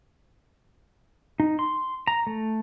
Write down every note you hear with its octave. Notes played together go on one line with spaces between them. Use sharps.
D#4
C6
A#5
A3